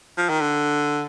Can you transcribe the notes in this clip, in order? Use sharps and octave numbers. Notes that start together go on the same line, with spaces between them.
F3
D#3
D3